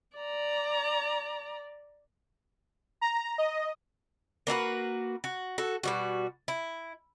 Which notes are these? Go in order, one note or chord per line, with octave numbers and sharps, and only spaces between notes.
D5 A#5
A#5
D#5
A#3 D4 F#4 B4
F#4
F#4 A4
B2 G3 F#4
E4